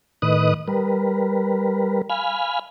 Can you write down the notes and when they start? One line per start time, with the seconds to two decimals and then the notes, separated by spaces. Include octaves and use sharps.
0.22 A2 D#3 B4 D#5 D#6 F#6
0.68 G3 A#4 B4
2.10 F5 G#5 B5 F6